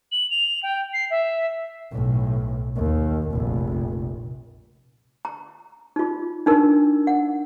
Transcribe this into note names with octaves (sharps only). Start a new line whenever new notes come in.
F#7
F7
G5
C7
E5
B1 A2
D#2
F1 A#1
A#5
D#4 F4
D4 D#4 A#4
F#5